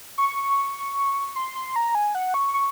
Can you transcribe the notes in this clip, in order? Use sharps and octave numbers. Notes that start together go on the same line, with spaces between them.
C#6
C6
C6
A#5
G#5
F#5
C#6
C#6